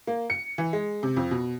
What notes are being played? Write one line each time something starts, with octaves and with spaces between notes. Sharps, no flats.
A#3
C#7
E3
G#3
C3
F2
B2